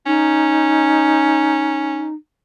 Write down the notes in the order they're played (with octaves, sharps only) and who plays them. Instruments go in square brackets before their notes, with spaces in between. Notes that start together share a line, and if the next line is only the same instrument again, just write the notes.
[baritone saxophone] C#4 [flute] D#4